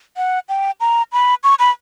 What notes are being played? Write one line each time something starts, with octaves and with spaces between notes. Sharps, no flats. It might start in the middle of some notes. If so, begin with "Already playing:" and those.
F#5
G5
A#5
B5
C#6
B5